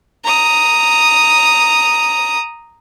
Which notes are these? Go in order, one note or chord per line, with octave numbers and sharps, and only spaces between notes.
A#5 D#6